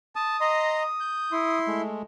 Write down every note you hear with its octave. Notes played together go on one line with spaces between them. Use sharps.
A5 D#6
D#5 A#5 C6
G6
E4 C6
G#3 A3